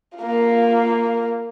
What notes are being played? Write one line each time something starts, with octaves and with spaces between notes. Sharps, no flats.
A#3 F4